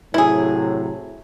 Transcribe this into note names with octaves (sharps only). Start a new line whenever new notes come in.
A2 C3 F#3 E4 G#4